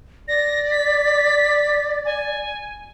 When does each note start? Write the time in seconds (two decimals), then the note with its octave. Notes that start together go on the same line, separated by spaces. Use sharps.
0.28 D5 A#6
0.71 B6
2.05 G#5